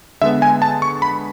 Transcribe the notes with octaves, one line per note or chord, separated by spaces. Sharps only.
D3 G#3 B3 E5
G#5
A5
C#6
B5